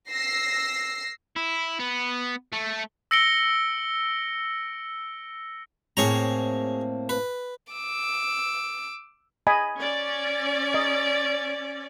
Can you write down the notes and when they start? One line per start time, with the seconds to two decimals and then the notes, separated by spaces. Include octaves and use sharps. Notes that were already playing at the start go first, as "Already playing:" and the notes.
0.11 E6 A#6 C7
1.36 E4
1.79 B3
2.53 A3
3.11 E6 A#6 C#7 D7 G7
5.97 A2 A#3 C4 G#4 C#5 A#5
7.09 B4
7.73 D6 E6
9.47 D#5 G#5 B5
9.79 C#4 D5
10.74 D#5